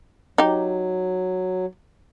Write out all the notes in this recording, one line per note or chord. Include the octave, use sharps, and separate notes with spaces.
F#3 D#4 G4